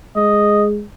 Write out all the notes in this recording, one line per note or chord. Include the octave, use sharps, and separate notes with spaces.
G#3 D#5